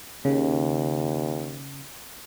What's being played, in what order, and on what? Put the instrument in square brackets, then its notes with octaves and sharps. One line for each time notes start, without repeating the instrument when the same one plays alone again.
[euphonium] D#2 [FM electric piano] C#3